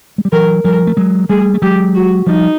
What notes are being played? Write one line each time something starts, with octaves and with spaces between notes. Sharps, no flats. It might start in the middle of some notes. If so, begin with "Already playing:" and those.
G#3
G3
E3 F#3 A#4
F3 G3 A#4
A3
F#3 G#3
G3 A3 G#4
A3
F#3 G#3 G4
F#4
F3 G3 D#4